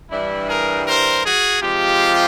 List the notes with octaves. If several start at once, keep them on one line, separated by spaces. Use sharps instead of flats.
G2 E3 G3 D4 E4
G#4 A#4
A#4 C5
F#4 G#4
C3 F3 G#3 F4 G4